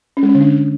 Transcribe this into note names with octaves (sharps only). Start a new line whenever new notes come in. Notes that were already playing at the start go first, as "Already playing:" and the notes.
C#4
G#3
C#4
D3
D4